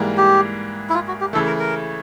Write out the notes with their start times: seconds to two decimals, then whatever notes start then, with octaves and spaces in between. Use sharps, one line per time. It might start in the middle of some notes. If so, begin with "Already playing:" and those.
Already playing: G#2 E3 G3 A#3
0.18 G4
0.89 E4
0.95 F4
1.08 F#4
1.21 G4
1.33 C#3 E3 A3 A4
1.47 A#4
1.59 A#4